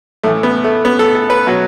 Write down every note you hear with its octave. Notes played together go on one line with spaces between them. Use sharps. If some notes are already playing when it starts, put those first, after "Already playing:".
A2 E3 A3
B3
A3
B3
A4
A4
B4
B2 F#3